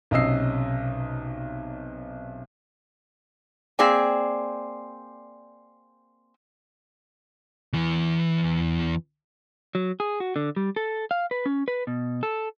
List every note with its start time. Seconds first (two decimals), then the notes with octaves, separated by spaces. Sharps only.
0.11 B1 C3 C#4 D#5 E6 C7
3.79 A#3 C4 G#4 D5 G5
7.73 E2 E3
9.75 F#3
10.00 G#4
10.20 F#4
10.36 D3
10.56 G3
10.76 A4
11.11 F5
11.31 B4
11.46 C#4
11.68 B4
11.87 B2
12.23 A4